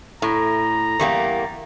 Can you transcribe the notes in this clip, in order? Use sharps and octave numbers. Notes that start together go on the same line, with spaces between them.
A2 A#5
E2 G3 A#3